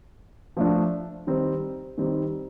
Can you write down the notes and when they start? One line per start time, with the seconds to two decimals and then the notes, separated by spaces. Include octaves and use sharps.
0.57 F3 A3 D4
1.27 D#3 G3 C4 D#4
1.98 D#3 G3 C4 D#4